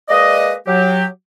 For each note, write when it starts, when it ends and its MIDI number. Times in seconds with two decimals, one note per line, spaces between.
0.09 0.53 56
0.09 0.53 58
0.09 0.53 71
0.09 0.53 74
0.09 0.53 75
0.67 1.05 54
0.67 1.05 67